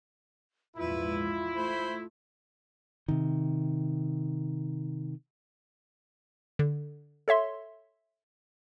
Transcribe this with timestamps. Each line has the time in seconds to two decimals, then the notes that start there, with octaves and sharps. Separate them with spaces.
0.77 A#1 E2 G#2 E4 F4 B4
1.56 A3 C5 B5
3.08 C3 D#3
6.59 D3
7.28 A4 C#5 E5 C6